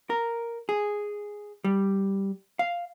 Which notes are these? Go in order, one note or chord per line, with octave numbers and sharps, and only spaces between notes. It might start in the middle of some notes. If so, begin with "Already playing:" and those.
A#4
G#4
G3
F5